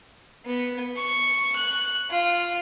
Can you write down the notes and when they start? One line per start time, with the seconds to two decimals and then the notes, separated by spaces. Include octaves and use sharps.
0.46 B3
0.97 C#6
1.56 F#6
2.10 F4